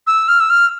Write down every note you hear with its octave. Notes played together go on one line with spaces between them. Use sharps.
E6
F6
E6
F6